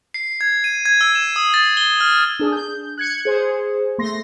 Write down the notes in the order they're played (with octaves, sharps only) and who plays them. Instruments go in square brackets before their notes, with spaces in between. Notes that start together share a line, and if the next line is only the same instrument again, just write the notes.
[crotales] C7
G#6
D#7
G#6
E6
E7
D#6
A6
G7
F6
[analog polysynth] D4 G#4
G6
F#6 G#6 C#7
G#4 C5
A3 C6 A#6